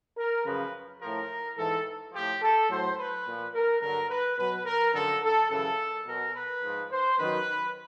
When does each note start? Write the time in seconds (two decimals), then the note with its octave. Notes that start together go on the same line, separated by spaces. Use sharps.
0.17 A#4
0.45 F#2 C#3 F3 B4
1.01 A2 F3 A#4
1.57 G#2 E3 A4
2.13 A2 F3 G4
2.42 A4
2.70 A2 F#3 C5
2.98 B4
3.26 A#2 F3
3.54 A#4
3.82 G2 D3 F#3 A#4
4.10 B4
4.38 B2 F#3 B4
4.66 A#4
4.94 F#2 D3 F3 A4
5.23 A4
5.50 F#2 C#3 E3 A4
6.06 B2 F#3 A#4
6.35 B4
6.63 G#2 F3
6.91 C5
7.18 F#2 D#3 F#3 B4